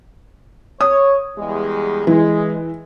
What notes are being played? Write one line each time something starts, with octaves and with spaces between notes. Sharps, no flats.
C#5 D#6
E2 G3 G#3
E3 G#3